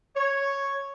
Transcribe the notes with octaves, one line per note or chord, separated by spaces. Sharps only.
C#5